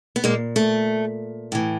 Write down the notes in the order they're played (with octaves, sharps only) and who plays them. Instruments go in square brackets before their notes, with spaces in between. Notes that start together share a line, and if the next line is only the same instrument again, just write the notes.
[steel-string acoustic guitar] B3
A#2 G#3 A#3
A3
A2 E3